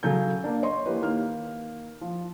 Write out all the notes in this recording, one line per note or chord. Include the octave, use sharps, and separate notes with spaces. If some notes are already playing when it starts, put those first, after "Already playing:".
C#3 F#3 A4 G#5 G6
A#3 D4
C#5 D#5 C6
E3 A#3 G4 B4
D#3 A#3 F6
F3